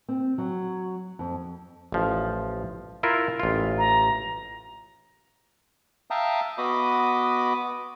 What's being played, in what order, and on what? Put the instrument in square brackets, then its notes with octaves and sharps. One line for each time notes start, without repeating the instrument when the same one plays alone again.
[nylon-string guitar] C4
F#3
F2
[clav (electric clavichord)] A1 F3
E4 F4 A#4
A1 F4
[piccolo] A#5
[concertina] E5 F5 G5 A5 A#5 D#6
B3 F#4 D#5 B5 D6 D#6